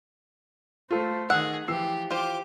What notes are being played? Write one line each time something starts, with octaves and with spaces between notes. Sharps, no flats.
A3 F4 A4 C5
D#3 G#4 F#5 E6
E3 F3 G4 E6 C7
F4 G4 C5 D6